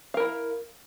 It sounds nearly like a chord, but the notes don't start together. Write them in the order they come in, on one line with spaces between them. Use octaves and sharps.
F5 A#4 E4